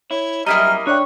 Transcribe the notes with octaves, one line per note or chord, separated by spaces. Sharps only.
E4 C#5
F#2 G3 A#3 E4 D#5 A#5 F6
D4 C#5 D5 G5 F#6